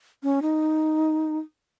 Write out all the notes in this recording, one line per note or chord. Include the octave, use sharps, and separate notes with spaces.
C#4
D#4